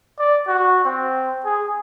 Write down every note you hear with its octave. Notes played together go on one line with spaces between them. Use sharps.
D5
F#4
C4
G#4